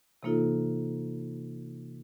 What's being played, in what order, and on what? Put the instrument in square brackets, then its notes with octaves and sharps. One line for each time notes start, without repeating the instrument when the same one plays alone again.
[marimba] C3 E3 A#3 D#4 F4 A4